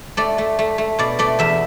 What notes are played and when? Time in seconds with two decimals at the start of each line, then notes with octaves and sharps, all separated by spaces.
0.17 A3 D5
0.38 A3
0.59 A3
0.78 A3
0.99 B2 D5
1.19 A3 D5
1.39 E2 E5